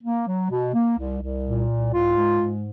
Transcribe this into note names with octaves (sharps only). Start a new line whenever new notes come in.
A#3
F#3
B2
A#3
C2
C2
A#2
C2
G#2 F4
G#3
G#2